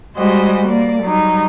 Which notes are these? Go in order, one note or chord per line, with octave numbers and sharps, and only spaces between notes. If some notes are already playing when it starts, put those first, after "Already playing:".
G3 G#3 F#4 C5 D#5
A#3 D5
F#3 G3 D#4